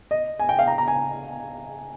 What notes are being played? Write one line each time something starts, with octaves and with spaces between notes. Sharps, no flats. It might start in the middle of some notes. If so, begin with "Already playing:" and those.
D#5
G#5
G5
F5
A#5
A#5
G#5